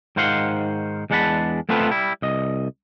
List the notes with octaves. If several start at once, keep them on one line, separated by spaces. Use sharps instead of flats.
G#2 D#3 C5 F5 F#5 C6
E2 G#3 D4 F#5 A5 B5
A3 B3 C4 F4 A4 B4
G3 E4
C2 D#5